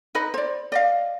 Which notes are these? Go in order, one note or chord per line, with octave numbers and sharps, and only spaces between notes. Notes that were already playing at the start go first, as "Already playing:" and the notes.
D#4 B4 D#5 B5
C5 D5
D5 D#5 F5